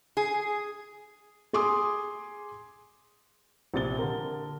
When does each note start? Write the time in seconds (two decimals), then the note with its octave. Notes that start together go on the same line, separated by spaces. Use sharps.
0.17 G#4
1.53 G#4 G#5 C6 D6 D#6
3.74 A#1 C3 A6 G7
3.99 D3 A#4